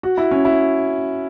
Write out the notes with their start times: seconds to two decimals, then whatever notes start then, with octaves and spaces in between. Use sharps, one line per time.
0.03 F#4
0.17 E4
0.31 C#4
0.45 E4